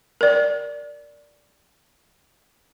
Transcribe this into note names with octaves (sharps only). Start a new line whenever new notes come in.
A#4 D5